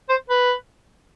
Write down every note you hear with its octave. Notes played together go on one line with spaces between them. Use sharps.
C5
B4